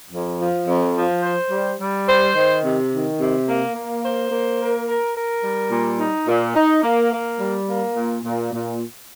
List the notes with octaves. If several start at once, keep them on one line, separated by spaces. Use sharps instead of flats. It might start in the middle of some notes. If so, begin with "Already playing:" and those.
F2
F3
F2
F3
C5
G3
G3
C5
D#3
C3
D#3
C3
A#3
A#3
C5
A#3
A#4
A#4
A#4
G3
A#2
D#4
A#2
D#4
A#3
A#3
G3
A#3
A#2
A#2
A#2